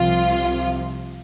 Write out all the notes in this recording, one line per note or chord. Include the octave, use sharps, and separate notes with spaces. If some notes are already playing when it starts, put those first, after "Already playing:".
Already playing: C2 C3 F3 F4